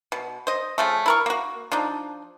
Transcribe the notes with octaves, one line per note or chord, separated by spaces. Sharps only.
B2
C5 D#5
C#3 F3 A3
E4 A#4 C#6
A#3 F#4
F3 D4 D#4